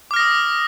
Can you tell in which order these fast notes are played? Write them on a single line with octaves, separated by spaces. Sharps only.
D6 F6 A#6 D#6